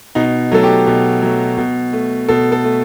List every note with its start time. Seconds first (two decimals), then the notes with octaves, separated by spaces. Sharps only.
0.15 B2 D#4
0.51 F#3 A3 A4
0.63 G4
0.87 B2
1.22 F#3 A3
1.58 B2
1.93 A3
2.28 B2 A4
2.52 A4
2.64 A3